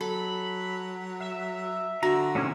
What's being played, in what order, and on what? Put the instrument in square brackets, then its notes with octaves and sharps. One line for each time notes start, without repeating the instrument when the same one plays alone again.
[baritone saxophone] F#3 [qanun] A4 [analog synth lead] B5
[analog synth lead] E5
[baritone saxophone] D3 [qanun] F#4 [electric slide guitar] A#5
[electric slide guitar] A2 C3 D#3 [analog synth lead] C#4